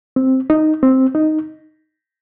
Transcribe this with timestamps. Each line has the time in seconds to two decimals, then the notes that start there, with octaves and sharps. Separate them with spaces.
0.16 C4
0.50 D#4
0.83 C4
1.15 D#4